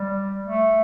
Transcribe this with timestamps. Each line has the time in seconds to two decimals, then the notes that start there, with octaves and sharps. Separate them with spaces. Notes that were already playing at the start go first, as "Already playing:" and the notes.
Already playing: G3
0.42 A3